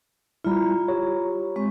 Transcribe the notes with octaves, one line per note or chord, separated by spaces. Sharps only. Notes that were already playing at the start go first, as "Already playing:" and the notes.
G3 E4 F4 A#5 B5
G4 C#5
G#3 C4 C#6